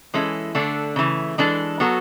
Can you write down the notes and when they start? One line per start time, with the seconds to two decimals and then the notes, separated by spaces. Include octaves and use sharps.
0.14 E3 G#3 C#4 E4 A4
0.55 D3 A3 D4 A4
0.96 C#3 E3 A3
1.38 E3 G#3 D4 A4
1.80 F#3 B3 F#4 A4